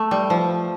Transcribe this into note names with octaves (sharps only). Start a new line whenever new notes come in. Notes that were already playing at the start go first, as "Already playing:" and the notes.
Already playing: A3
G3
F3